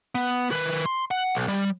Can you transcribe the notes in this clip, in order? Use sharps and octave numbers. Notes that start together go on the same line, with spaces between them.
B3
D#3 B4
C6
F#5
B1
G3